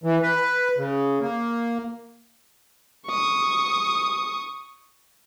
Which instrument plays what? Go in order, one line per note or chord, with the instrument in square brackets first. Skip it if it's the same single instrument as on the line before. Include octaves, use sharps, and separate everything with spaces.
[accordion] E3
B4
C#3
A#3
[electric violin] C#6 D#6